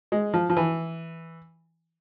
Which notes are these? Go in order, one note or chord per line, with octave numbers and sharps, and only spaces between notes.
G#3
F3
F3
E3